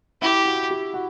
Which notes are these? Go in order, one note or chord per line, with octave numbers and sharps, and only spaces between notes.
E4 G4
F#4
G4
F#4